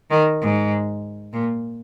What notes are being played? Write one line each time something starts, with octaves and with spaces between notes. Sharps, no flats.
D#3
G#2
A#2